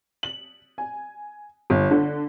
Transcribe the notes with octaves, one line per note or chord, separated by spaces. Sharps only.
F#7
G#5
G1
D3